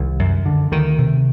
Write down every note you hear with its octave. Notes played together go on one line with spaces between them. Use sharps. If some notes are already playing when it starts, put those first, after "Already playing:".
Already playing: C2 D#3
F#2
D3
D2 D#3
C3